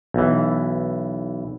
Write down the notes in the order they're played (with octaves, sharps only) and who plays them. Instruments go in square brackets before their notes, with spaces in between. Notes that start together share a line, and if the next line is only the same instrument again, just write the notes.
[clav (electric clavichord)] B1 E3